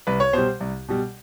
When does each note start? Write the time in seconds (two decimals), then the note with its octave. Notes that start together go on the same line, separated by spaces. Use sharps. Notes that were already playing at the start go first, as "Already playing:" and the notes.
0.07 C2 B4
0.20 C#5
0.33 B2 G3 C5
0.60 C2
0.88 B2 G3